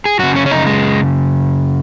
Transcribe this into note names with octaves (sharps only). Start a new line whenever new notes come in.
G#4
F#2 C#3 F#4
C#4
C#4
D#4
G#3